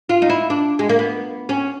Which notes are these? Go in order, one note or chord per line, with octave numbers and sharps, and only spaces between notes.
F4
D#4
E4
D4
G#3
A#3
B3
C#4